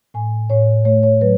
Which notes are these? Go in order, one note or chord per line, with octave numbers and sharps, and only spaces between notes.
A2 G#5
A2 C#5
A3 C#5
C#5
F#3 B4